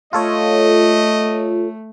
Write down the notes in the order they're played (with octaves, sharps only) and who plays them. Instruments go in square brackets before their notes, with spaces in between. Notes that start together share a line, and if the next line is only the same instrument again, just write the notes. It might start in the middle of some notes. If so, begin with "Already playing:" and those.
[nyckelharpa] A3 [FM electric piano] F4 A4 C#5 [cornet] D#5